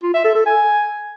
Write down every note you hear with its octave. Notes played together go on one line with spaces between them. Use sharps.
F4
E5
A4
A4
G#5